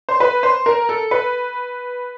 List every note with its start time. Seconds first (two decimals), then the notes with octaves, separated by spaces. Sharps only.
0.09 C5
0.20 B4
0.43 C5
0.66 A#4
0.89 A4
1.11 B4